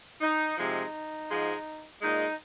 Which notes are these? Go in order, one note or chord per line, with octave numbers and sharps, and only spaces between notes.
D#4
C3 F3 G#3 D#4
G#2 F3 G#3
A#2 G#3 D#4